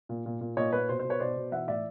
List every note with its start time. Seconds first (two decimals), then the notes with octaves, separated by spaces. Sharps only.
0.09 A#2
0.26 A#2
0.41 A#2
0.57 A#2 C#5 D#5
0.72 A#2 B4 C#5
0.89 B2 C5
0.99 C5
1.05 B2
1.10 B4 C#5
1.20 B2 C5 D5
1.36 B2
1.52 E3 E5 F#5
1.68 A2 D5 E5